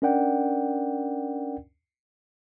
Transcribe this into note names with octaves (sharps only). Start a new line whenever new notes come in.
C#4 D4 A#4 D5 F#5 G5